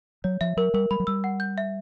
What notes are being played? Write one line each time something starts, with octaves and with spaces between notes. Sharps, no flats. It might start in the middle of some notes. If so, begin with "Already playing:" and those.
F#3 C#5
F3 E5
F#3 A#4
G3 A#4
G3 B5
F#3
G3 E6
F#5
G6
E5